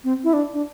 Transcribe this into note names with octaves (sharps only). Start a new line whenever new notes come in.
C4
E4
D4
D4